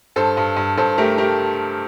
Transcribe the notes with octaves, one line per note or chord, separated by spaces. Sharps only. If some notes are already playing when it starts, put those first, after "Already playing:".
G2 A4 C5
G2
G2
G2 A4 C5
A3 G4 A#4
A3 G4 A#4